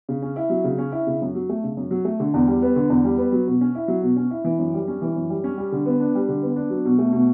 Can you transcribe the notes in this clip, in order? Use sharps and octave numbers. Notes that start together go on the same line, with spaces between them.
C#3
C#4
E4
F#3
C#3
C#4
E4
C#3
F#2
F#3
A3
C#3
F#2
F#3
A3
D3
E2
G3
B3
D3
E2
G3
B3
F#3
B2
C#4
E4
F#3
B2
C#4
E4
E3
F#2
G3
C#4
E3
F#2
G3
C#4
G3
D3
B3
D4
G3
D3
B3
D4
F#3
B2
A3
B2